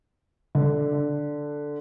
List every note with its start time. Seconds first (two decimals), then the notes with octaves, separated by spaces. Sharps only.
0.55 D3